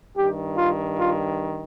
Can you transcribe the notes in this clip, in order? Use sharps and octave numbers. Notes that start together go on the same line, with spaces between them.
G2 D#3 G4
F4
F4